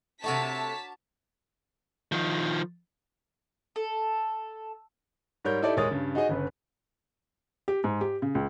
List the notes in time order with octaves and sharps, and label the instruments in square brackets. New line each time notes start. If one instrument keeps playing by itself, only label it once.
[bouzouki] C3 A3 [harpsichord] D4 F#4 A#4 [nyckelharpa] C#5 [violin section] A5 B6
[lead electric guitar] D#3 F3
[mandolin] A4
[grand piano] G#2 G3 A#4 C#5 G6
D#4 E4 G4 A4 D5 E5
D#1 G#3 A#4 C#5 D#6 A6
G2 C#3
D#4 F#4 G#4 D#5
G1 C#3 B4
[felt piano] G4
G#2
G4
C#3
C#2